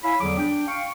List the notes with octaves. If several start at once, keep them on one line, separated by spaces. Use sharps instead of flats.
E4 C#5 F5 G#5 B5
E2 D3 F#3 G3 G#4 D6
D4 G5
F5 G5 C#6